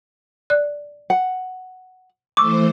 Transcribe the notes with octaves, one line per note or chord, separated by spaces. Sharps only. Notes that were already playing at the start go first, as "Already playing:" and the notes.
D5 F#6
F#5
E3 A3 C5 C#6 D6 E6